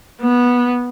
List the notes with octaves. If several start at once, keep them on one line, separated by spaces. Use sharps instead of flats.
B3